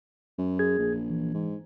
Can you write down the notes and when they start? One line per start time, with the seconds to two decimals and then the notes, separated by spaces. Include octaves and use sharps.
0.38 F#2
0.59 G#4 G#6
0.78 A#1
1.10 E3
1.34 G#2